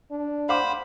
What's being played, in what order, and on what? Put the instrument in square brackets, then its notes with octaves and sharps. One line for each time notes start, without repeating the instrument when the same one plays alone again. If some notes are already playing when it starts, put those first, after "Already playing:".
[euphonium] D4
[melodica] C5 B5 [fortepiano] F5 F#5 D6